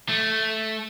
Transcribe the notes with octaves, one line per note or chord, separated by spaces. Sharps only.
A3